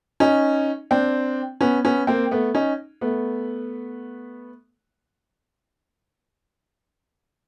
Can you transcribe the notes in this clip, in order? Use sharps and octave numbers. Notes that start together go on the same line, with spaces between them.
C#4 D#4
C4 D4
B3 C#4
B3 C#4
A#3 C4
A3 B3
C#4 D#4
A3 B3